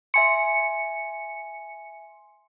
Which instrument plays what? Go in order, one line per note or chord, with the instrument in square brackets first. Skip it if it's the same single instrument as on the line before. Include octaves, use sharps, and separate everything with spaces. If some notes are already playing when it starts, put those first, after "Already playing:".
[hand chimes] E5 G#5 C6 [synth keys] C#7